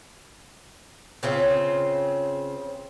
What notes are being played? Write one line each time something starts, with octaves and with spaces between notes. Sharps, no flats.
C#3 C4 F4